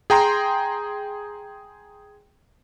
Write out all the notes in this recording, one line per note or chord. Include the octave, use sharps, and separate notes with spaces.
G#4 G5 A#5 C6